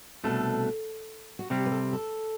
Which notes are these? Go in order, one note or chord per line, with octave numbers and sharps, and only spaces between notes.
C2 B2 A3 D4 A4
F#4
C3 G3 C4 G4
B4
A4
A4